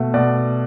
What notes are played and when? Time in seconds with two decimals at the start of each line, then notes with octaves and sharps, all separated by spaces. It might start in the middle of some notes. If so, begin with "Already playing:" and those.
Already playing: B2 A3
0.14 B2 D5